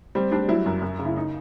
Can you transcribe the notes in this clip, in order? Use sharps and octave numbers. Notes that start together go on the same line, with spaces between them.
G3 C4
G3 D4
F#3 E4
F#2
F#2
C#3
E4
D#4